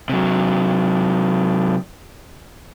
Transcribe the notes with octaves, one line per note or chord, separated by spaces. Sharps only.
C3 F#3